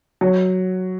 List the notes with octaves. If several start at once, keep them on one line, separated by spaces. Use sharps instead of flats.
F#3